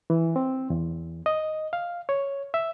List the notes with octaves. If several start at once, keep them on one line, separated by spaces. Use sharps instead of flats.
E3
C4
E2
D#5
F5
C#5
E5